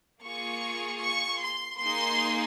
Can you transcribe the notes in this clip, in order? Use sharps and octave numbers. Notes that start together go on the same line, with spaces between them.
A#3 F4 G#4 C#6
C#6
C6
A#3 D#4 G#4 C6